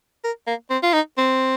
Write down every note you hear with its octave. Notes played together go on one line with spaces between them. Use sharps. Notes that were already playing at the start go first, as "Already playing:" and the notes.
A#4
A#3
C4
F4
D#4
C4